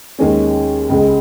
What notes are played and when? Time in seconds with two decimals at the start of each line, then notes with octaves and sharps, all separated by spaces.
0.19 D#2 D#3 G#3 C#4
0.90 C#2 C#3 G#3